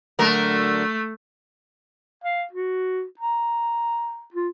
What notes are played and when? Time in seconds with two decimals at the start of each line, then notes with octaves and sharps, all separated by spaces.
0.19 D3 F#3 A3 A#4
2.24 F5
2.53 F#4
3.19 A#5
4.34 F4